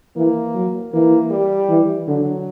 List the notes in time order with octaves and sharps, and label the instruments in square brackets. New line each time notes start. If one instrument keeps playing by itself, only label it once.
[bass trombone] E3 [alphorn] A#3
[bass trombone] F#3
[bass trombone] E3 [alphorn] A#3
[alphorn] G3
[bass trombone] E3
[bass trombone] D3 [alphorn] F#3